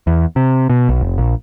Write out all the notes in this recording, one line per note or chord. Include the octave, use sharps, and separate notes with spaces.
E2
C3
B2
B1
F1
A#1